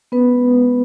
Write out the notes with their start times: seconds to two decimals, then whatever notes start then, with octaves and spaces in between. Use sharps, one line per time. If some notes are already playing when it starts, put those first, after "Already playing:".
0.12 B3 C#4 B4
0.33 G#3
0.53 G#3